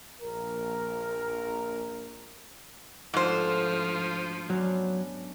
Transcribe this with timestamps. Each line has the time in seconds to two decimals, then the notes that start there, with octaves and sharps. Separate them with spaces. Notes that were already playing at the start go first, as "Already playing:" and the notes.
0.22 A#1 A#4
3.14 G#2 D3 F3 A3 F#4 C5
4.50 F#3 B3 C#4 D4